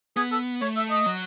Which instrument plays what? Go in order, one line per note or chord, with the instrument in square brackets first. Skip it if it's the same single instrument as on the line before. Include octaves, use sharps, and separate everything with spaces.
[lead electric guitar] B3 [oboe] G#4
[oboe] A4
[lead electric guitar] A3 [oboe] C#5
[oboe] E5
D#5
[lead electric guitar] F#3